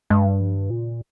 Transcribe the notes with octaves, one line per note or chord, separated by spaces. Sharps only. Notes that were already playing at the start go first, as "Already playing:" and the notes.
G2 G#3
G3
F3
D#3
A#2 C#3